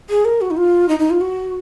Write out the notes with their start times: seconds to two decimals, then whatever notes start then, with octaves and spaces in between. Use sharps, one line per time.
0.10 G#4
0.25 A#4
0.41 F#4
0.51 D#4
0.57 F4
0.89 D#4
0.99 D#4
1.11 F4
1.21 F#4